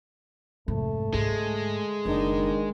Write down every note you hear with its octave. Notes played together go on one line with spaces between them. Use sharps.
F1 G#2 A3
G#2 D3 G#3
F#1 D#3 D4 D#4